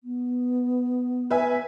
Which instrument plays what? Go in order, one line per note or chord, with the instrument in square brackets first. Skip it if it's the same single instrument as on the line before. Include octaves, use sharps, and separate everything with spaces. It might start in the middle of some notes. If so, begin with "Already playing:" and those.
[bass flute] B3
[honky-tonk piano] B4 E5 G#5